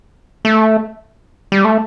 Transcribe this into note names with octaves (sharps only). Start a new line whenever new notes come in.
A3
G3
A3